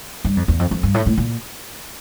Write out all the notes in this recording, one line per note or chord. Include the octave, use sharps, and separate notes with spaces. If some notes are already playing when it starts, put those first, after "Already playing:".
G2
F2
E2
F2
F2
G2
A2
A2
A#2